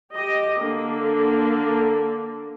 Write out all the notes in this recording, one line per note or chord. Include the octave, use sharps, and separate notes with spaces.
G4 D#5
D3 A#3